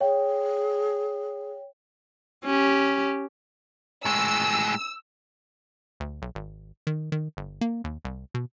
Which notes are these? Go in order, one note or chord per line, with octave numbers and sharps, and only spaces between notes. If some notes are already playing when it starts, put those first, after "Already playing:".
G#4 C#5 F5 G5
C#4 G4
A2 G#3 E6
D2
B1
G#1
D#3
D#3
G1
A#3
D#2
C2
B2